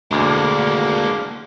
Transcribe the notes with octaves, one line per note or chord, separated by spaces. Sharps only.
D2 G#3 A#3 D4